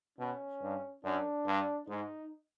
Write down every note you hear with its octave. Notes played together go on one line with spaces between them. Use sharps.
B2 C#4
G2
F#2 D4
G2
G#2 D#4